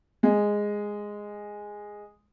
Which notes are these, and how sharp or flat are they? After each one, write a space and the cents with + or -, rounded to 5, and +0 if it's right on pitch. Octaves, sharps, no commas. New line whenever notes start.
G#3 -5